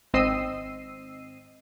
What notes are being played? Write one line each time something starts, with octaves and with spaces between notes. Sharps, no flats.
G#1 C4 D#5 E6 C7 D#7